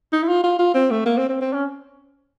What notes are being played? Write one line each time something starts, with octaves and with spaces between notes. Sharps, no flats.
D#4
E4
F4
F4
F4
C4
A3
A#3
C4
C4
C4
C#4